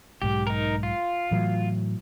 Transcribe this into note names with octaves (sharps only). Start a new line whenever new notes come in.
B1 G#2 G4
D#4 A#4
F4
A2 E3 F#3